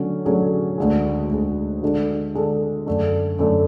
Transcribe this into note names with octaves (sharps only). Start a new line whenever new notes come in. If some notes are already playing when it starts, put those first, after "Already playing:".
Already playing: D3 F#3 A3 C#4
D3 F#3 A3 C#4 G#4
D2 D3 G#3
D2 D3 G#3
D3 G#3 D4 A4
D3 G#3 D4 A4
F#2 D3 A3 D4
F#2 D3 A3 D4